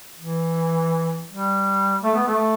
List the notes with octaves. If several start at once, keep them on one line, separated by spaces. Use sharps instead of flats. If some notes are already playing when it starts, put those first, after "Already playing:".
E3
G3
A3
B3
A3